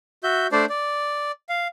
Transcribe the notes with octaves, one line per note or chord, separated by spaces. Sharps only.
F#4 E5 G6
A3 D4 C5 D5
D5
F5